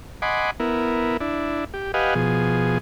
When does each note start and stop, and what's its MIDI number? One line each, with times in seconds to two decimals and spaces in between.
0.22 0.51 75
0.22 0.51 78
0.22 0.51 80
0.22 0.51 83
0.22 0.51 84
0.22 0.51 86
0.60 1.17 59
0.60 1.17 64
0.60 1.17 70
1.21 1.64 62
1.21 1.64 64
1.74 1.92 67
1.94 2.14 67
1.94 2.14 71
1.94 2.14 75
1.94 2.14 77
1.94 2.14 78
1.94 2.14 80
2.15 2.78 47
2.15 2.78 53
2.15 2.78 68